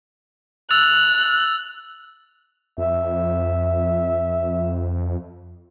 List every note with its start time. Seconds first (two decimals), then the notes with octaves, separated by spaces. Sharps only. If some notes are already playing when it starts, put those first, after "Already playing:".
0.71 E6 F#6 A6 F7
2.78 F2 E5